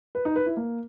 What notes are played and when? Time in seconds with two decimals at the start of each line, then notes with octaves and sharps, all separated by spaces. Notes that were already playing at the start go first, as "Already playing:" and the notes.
0.15 B4
0.25 D#4
0.36 B4
0.46 E4
0.57 A#3